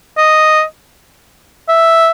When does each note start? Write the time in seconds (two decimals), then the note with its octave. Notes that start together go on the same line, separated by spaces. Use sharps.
0.17 D#5
1.68 E5